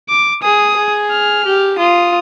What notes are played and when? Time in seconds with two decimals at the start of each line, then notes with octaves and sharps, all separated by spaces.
0.09 D6
0.43 G#4 D#6
0.77 G#4
1.11 F6
1.45 G4
1.78 F4 D#6